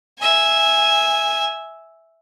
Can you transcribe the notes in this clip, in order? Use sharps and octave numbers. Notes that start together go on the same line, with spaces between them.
E5 G#5